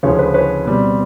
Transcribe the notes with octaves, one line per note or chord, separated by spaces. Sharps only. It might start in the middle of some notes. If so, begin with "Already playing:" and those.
D2 C#3 F3 G#3 C#4 B4 C#5
B4
B4 C#5
B2 G3 C4